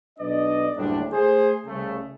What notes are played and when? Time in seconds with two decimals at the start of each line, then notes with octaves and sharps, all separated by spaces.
0.19 B1 D4 B4 D5 D#5
0.77 F#1 D2 A2 G3 D4
1.12 A3 G#4 C5
1.66 C2 C#3 A3